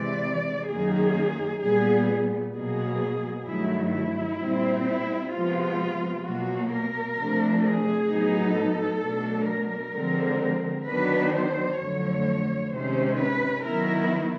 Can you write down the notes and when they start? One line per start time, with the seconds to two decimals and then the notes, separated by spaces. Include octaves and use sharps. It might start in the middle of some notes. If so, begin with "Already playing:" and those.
Already playing: C3 E3 G#3 D5
0.69 F#2 D#3 F#3 A#3 G#4
1.62 A#2 G3 B3 G#4
2.55 B2 F#3 A#3 G#4
3.47 G2 D#3 F#3 A3 E4
3.93 E4
4.40 A#2 G3 C4
4.86 E4
5.32 C3 F3 G#3 B3 F4
6.24 B2 F#3 A#3 F#4
6.71 A#4
7.16 C3 F3 A3 D4
7.63 G#4
8.09 A2 F#3 B3 D#4
8.55 A4
9.01 B2 F#3 A3 D4
9.48 A#4
9.94 D3 F3 G#3 C4
10.87 D#3 F#3 B3 D4 B4
11.32 C5
11.79 F2 D3 F#3 A3 C#5
12.71 C3 D#3 G#3 C#4 C5
13.18 B4
13.64 D#3 F#3 B3 E4 A#4